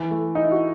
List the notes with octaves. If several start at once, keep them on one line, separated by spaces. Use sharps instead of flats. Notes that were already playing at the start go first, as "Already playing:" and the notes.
Already playing: E3
A3
D#4
E4
F#4